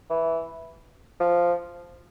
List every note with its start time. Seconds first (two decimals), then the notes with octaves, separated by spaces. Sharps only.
0.10 E3
1.20 F3